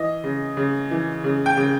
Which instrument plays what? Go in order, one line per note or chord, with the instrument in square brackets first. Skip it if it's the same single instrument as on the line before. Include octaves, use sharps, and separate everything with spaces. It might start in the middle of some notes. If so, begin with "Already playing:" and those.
Already playing: [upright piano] E3 D#5
C#3
C#3
E3
C#3
G5
C#3